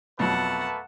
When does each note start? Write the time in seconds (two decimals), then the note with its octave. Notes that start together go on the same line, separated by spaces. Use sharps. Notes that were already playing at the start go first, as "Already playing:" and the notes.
0.19 F2 B2 F#3 A3 A#3 B4 F#5 A5